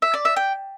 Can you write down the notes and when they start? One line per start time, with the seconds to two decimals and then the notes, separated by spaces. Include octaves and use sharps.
0.02 E5
0.14 D5
0.25 E5
0.36 G5